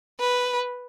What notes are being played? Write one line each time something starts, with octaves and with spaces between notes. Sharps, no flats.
B4